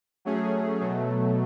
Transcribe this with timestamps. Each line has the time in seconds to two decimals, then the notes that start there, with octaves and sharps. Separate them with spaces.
0.25 F#3 A3 C#4 G#4
0.81 B2 F#3 A3